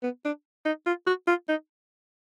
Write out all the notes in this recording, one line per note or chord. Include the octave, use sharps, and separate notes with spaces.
B3
D4
D#4
F4
F#4
F4
D#4